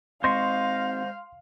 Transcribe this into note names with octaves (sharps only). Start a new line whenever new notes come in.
G#3 C4 C5 D#5 F5 C6 C#6